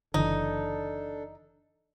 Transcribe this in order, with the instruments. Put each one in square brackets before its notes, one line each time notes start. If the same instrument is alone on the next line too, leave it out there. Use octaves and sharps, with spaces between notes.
[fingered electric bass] F#1 D3 E3 [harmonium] D4 A4 [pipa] D#4